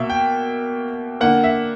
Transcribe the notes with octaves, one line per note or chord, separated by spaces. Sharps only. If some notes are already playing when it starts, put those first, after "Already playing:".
Already playing: B2 A#3 E5
G5
D3 A#3 F#5
E5